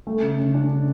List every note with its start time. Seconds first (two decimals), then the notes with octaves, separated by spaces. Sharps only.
0.07 A3
0.22 C#3
0.38 C#3
0.54 D4
0.70 C#3